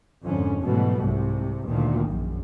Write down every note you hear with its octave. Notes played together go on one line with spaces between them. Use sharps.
F2 G#2 D3 C#4
G#2 B2 E3 F#3 G3 A3
C2 G#2 C3
D2 A#2 D#3 A#3
A#1 F#2